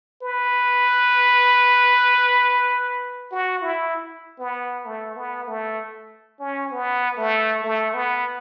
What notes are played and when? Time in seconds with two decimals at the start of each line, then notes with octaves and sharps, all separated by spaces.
0.23 B4
3.32 F#4
3.62 E4
4.40 B3
4.86 A3
5.17 B3
5.48 A3
6.40 C#4
6.72 B3
7.18 A3
7.64 A3
7.94 B3